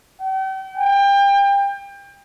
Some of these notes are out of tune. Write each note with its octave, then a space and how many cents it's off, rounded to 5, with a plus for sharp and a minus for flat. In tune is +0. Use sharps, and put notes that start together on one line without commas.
G5 -40
G5 +30